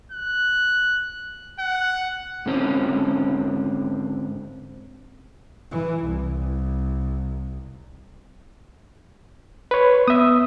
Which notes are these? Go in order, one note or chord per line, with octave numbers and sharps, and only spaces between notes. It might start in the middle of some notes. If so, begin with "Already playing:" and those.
F#6
F#5
G#2 D3 C4 C#4
E3
C2
B4 C#5
B3 E5 D#6